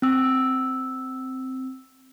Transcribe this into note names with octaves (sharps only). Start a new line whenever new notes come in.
C4 E6